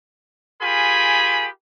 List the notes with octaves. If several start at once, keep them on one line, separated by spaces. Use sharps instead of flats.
F4 G4 G#4 A#4 G#5 B5